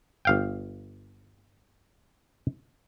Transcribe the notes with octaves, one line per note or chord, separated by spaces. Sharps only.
G1 F5 G5